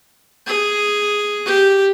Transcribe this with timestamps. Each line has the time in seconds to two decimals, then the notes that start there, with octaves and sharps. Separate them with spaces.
0.46 G#4
1.46 G4